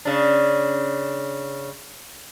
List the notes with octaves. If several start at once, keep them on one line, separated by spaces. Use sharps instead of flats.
C#3 D4